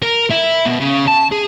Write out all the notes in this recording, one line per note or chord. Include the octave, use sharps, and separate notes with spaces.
A#4
E4
B2
C#3
A5
G#4